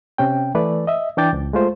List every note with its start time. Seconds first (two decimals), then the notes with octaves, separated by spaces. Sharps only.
0.18 C3 C#4 G5
0.55 E3 A3 B4 D5
0.87 D#5 E5
1.17 E3 D4 G5 D6 G6 A6
1.33 C#2
1.53 G#3 A3 F4 C5